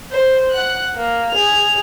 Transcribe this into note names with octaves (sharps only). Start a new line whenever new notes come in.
C5
F#5 F#6
A#3
G#4 F7